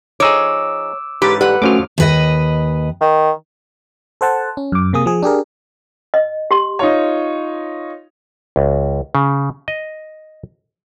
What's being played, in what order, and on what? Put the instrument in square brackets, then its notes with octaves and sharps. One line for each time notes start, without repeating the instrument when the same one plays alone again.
[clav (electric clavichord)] F3 D#4 G#4 [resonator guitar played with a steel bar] C#5 [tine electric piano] D6 E6
[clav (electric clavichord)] G#2 E3 C#4 [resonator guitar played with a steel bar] G4 [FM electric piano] B4 A6
[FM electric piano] G3 [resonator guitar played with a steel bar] B4 F#5
[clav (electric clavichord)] D3 F3 F#3 [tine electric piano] A3 C#4 F#4 [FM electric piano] D6 F6
[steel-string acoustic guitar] D#2 B4 D#5
[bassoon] D#3
[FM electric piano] A4 C5 F#5 A5
C#4
F#2 D6
C3 A#3 G#4 D#6
F3 G#4
D4 G4 G#4 A#4
[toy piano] D#5
G4 C6
[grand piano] D#4 F4 C#5
[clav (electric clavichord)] C#2
C#3
D#5